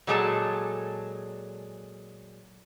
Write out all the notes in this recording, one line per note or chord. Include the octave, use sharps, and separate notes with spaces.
A#2 F#3 G#3 G#4 A4 A5